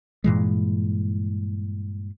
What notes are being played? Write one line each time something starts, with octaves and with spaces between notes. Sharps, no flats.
G2 A#2 E3 G#3